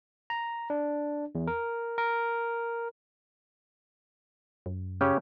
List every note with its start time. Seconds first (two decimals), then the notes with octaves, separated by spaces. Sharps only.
0.30 A#5
0.70 D4
1.35 E2
1.47 A#4
1.98 A#4
4.66 F#2
5.01 C#3 C#4 G4